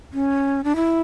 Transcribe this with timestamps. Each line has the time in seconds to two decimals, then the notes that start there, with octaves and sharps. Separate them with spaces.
0.13 C#4
0.64 D4
0.76 E4